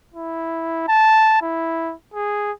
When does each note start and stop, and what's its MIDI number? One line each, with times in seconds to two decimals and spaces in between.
0.14 0.87 64
0.88 1.40 81
1.42 1.94 64
2.14 2.52 68